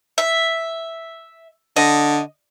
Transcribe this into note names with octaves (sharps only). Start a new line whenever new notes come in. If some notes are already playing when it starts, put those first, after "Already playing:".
E5
D3 D#5